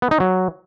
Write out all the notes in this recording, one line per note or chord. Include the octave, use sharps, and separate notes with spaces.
B3
D#4
F#3